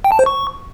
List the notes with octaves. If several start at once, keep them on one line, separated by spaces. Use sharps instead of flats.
G5
A5
C5
C#6